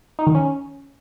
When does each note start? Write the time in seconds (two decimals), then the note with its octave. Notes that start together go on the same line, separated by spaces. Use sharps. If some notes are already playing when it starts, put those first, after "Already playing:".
0.19 D#4
0.27 D#3
0.35 C#4